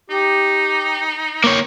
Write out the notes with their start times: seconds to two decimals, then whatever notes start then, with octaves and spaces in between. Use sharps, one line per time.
0.10 D#4 G4
1.44 A#3 C#5